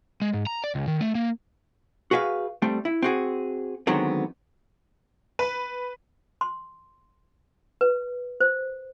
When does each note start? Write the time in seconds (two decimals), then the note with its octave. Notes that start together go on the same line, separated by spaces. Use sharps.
0.22 G#3
0.34 G#2
0.47 A#5
0.64 D5
0.75 C#2
0.88 D#3
1.01 A3
1.15 A#3
2.11 F#4 G#4 B4 E5 F5
2.62 G3 A3 C4
2.85 E4
3.02 C4 F#4 G#4
3.87 D3 D#3 F#3 G#3 B3 C4
5.39 B4
6.41 C6
7.81 B4
8.41 C5